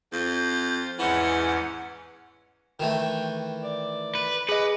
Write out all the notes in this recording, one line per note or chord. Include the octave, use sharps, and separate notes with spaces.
F2 F4 G6
E2 G#2 E3 C#4 F#5
D#3 E3 A3 G5
D5
B4
G#4 B4 D#5 D6